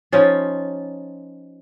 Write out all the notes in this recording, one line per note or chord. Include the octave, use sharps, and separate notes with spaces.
F3 C#4 D#4 F4